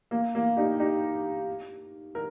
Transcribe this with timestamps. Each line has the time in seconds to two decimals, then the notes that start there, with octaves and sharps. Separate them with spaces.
0.11 A#3
0.35 A#3
0.57 D#4 G4
0.80 D#4 G4
2.15 A#4